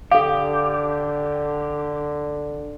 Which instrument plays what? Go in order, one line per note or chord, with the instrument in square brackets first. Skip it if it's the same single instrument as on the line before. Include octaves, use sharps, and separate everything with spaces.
[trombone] D3 [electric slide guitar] G4 [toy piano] A4 F5